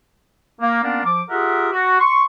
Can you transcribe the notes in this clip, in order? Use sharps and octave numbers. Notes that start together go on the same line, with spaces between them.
A#3
A#3 B3 C#4 D4 F4 A#4
F3 D6
F4 G4 G#4 A#4 E5 F#5
F#4
C6 C#6